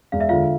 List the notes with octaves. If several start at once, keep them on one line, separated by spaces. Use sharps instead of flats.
E1 F5
E5
D3 F4 F5